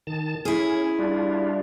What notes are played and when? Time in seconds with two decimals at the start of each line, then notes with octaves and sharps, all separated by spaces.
0.07 D#3 A5
0.45 C#4 E4 G#4
0.99 G3 D4 F4